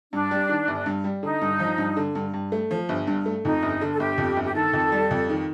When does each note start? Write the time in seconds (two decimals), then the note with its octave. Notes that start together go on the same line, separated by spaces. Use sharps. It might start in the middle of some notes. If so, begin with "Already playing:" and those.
0.13 G2 D4
0.31 G3
0.49 D#3
0.68 G1
0.86 G2
1.04 G3
1.23 D3 D#4
1.42 G2
1.60 F3
1.78 G2
1.97 D3
2.15 G2
2.34 G2
2.52 A3
2.71 F3
2.89 G1
3.07 G2
3.26 A3
3.45 F2 D#4
3.62 G1
3.81 D3
3.92 A4
4.00 G1 G4
4.18 F2
4.37 G1
4.45 G4
4.55 D#3 A4
4.73 F2
4.92 G3
5.11 F2
5.29 D#3